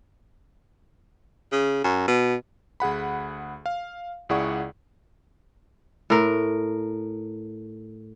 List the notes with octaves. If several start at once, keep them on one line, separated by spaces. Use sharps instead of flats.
C#3
F#2
B2
D2 G#4 F#5 B5
F5
C#2 E4 G#4 D5 F#5 C#6
A2 A#4